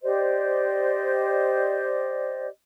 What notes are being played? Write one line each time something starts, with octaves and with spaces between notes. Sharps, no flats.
G4 C5 D5 D#5